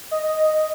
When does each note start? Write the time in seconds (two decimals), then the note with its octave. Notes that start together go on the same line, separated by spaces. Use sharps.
0.11 D#5